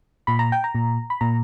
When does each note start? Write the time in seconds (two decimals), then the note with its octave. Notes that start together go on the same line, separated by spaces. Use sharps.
0.27 A#2 B5
0.39 A#5
0.52 G5
0.64 A#5
0.75 A#2
1.10 B5
1.21 A#2 A#5